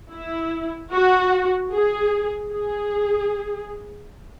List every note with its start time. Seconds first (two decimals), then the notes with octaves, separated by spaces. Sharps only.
0.13 E4
0.93 F#4
1.73 G#4
2.52 G#4